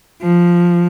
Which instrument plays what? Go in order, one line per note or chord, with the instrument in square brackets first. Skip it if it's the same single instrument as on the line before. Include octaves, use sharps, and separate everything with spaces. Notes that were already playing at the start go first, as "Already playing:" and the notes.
[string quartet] F3